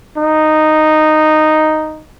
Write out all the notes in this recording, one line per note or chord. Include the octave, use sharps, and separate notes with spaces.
D#4